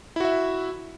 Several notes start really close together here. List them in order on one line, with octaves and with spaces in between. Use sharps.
E4 F#4 E5